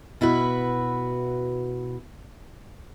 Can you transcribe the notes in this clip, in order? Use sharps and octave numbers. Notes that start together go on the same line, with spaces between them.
B2 E4 F#4 B4